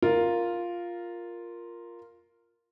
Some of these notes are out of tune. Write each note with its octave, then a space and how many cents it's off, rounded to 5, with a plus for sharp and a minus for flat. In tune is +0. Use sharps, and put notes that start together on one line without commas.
F4 +0 A#4 +0